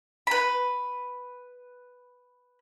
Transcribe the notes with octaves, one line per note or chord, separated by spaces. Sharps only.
B4 B5